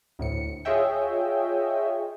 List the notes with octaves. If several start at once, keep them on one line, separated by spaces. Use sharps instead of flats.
D2 A2 C#7
F4 G#4 C#5 D#5 E5 G5